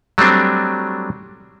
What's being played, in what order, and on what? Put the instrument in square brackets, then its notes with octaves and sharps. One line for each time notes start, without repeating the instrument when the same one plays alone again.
[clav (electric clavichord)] F#3 G3 A3 C4 D4